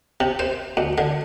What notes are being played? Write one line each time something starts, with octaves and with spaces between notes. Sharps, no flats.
C3
C5
D2
D3